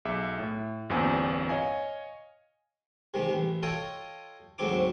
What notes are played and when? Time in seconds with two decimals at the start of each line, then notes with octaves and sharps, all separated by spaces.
0.05 B1 G#4 E5 D6
0.39 A2
0.90 G1 E2 G2 A#2 C4 G#5
1.49 C#5 D#5 F5 G#5
3.14 C3 D#3 G3 G#3
3.29 A1
3.63 F4 A4 C#5 D#5 G5 D#6
4.58 D2 G#2 F#3 C4 D#4 D6